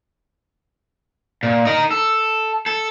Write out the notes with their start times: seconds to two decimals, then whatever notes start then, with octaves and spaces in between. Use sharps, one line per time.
1.43 A#2
1.65 D#4 A#4
1.91 A4
2.66 A4